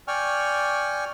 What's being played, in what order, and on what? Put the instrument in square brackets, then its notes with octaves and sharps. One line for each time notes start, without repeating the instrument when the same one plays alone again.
[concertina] D5 G5 G#5 C#6 F6